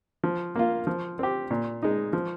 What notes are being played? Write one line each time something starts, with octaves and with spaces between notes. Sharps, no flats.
F3
A#3 F4
F3
C4 G4
A#2
G#3 D#4
F3